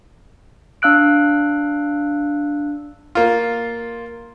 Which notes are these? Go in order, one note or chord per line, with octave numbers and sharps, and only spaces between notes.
D4 F5 E6 F#6 D7
A#3 F4